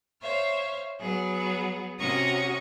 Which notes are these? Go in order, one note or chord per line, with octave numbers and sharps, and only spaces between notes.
C5 C#5 E5 F5
F#3 B3 G#4
C3 C#4 F#4 A#5 C#6 D#6